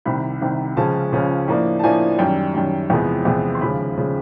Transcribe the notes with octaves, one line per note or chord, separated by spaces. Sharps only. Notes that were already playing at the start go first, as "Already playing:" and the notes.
C2 C3 D#3 B5
C2 C3 D#3
C#2 C#3 F3 G#3 C#4 A5
C#2 C#3 F3 G#3 C#4
A2 F3 A#3 D4
A5
A2 F3 A#3 D4 G#5
F#2 D#3 G3 G5
F#2 D#3 G3
E2 C3 F3 G#3 B3
E2 C3 F3 G#3 B3
C6
D#2 C#3 F3 G#3 B5
C#3 F3 G#3